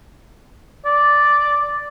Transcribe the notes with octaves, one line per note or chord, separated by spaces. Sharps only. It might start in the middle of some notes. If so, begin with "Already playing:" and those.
D5